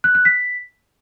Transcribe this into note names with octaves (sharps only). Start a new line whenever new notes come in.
F#6
F#6
B6